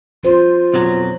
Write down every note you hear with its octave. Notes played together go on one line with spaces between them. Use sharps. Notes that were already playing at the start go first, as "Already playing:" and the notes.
F3 F4 C5
B1 F2 F#3